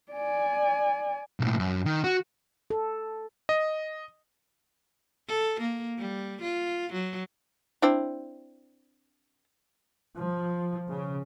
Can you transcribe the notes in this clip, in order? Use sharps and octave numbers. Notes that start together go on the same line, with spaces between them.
D5 G#5
B1 A2
F#2
D#3
F#4
A4
D#5
A4
A#3
G3
F4
F#3
C4 D4 E4
F3
C#3